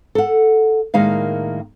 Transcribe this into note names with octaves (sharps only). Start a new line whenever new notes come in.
A4 F#5
A2 D#3 G#3 A#3 F5